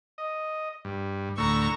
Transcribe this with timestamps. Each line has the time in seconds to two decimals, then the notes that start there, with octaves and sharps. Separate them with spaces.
0.18 D#5
0.85 G2
1.38 D2 A2 A#5 C#6 E6